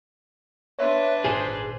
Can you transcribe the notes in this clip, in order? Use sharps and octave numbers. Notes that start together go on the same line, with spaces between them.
D4 B4 C#5 E5 C6
G#1 A#2 G#4 C5 G#5